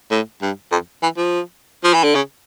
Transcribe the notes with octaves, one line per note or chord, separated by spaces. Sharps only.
A2
G2
F2
E3
F3
F3
E3
D3
C#3